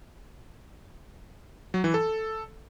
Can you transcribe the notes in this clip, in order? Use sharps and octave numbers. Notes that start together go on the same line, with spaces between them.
F#3
E3
A4